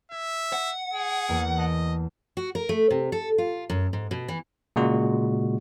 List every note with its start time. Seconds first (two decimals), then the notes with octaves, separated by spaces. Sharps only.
0.12 E5 G#6
0.53 F#5
0.93 G#4
1.29 E2 A#3
1.58 D#5 A5 C7 D7
2.37 F#4
2.55 A#4
2.69 A3
2.90 C3
3.12 A4
3.38 F4
3.70 F#2
3.93 G#2
4.11 B2
4.28 E3
4.76 A#2 C#3 G#3 F#4